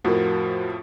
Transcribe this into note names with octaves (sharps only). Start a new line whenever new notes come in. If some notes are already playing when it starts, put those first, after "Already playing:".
F2 A2 F3 F#4 A#4